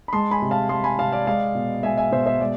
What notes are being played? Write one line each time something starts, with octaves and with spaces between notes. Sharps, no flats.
B5
G#3 A5 C6
G#5 B5
C3
F5 A5
G#3 A5 C6
G#5 B5
C3 F5 A5
D5 F5
G#3 D5 F5
B2
G#3 E5 G#5
E5 G#5
B2 C5 E5
C5 E5
G#3 D5